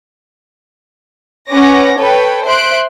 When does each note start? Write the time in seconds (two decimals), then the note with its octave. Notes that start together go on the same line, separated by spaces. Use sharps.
1.49 C#4 B4 C#5 F#5 D6 A#6
1.99 A4 B4 C#5 G5
2.44 C5 E5 C6 F#6 D7